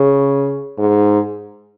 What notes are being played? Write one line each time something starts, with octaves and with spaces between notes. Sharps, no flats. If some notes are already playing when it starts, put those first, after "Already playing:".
Already playing: C#3
G#2